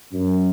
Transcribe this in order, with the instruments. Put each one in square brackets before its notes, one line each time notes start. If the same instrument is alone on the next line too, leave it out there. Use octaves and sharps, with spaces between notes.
[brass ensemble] F#2